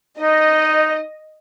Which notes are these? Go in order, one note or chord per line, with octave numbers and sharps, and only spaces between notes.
D#4 D#5